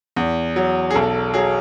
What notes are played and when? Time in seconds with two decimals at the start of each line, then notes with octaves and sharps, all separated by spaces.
0.16 E2
0.56 F#3
0.90 G#4
0.94 B1 A4
1.34 F#3 G#4